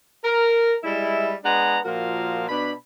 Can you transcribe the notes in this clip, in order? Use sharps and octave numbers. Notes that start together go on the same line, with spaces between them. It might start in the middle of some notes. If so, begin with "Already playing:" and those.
A#4
G3 G#3 E4
G#3 B3 D4 F#5 A#5
A#2 F3 F#4 A#4 F5
B2 D4 B5